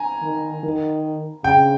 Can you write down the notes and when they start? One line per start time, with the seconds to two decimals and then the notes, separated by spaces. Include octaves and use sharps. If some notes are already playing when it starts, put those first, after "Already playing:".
Already playing: G#5 A#5
0.23 D#3
0.64 D#3
1.44 C#3 G5